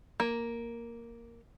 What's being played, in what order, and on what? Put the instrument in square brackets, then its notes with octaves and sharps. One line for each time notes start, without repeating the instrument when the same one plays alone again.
[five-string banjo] A#3